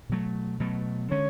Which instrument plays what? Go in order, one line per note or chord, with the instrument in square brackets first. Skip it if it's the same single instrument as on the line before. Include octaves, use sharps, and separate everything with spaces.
[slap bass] B2 F#3 A3
B2 F#3 A3
[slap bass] D3 G#3 C#4 [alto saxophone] C#5